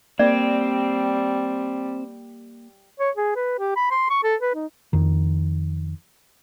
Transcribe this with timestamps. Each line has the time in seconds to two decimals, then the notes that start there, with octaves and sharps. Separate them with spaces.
0.19 G3 A#3 C4 D5
3.00 C#5
3.17 G#4
3.36 B4
3.59 G4
3.76 B5
3.91 C6
4.10 C#6
4.24 A4
4.40 B4
4.55 D#4
4.93 F2 D#3